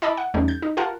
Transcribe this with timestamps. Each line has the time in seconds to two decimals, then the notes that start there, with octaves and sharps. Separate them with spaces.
0.02 E4 D#5 E5 A5 B5 D6
0.17 F#5
0.34 E2 D3 G3 A3 C#4 D#4
0.48 G6
0.62 D#4
0.77 F4 G4 A#4 F#5 A5